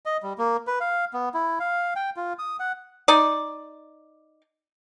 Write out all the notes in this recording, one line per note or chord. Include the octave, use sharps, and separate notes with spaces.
D#5
G3
A#3
B4
F5
B3
E4
F5
G5
F4
D#6
F#5
D#4 D5